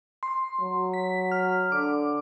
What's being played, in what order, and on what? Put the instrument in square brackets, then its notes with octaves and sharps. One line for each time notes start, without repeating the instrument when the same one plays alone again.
[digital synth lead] C6
[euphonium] F#3
[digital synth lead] B6
F6
[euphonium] D3 [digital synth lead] D6